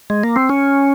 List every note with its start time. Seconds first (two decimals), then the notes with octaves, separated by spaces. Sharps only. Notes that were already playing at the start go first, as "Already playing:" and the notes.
0.10 G#3
0.24 A#3
0.36 C4
0.49 C#4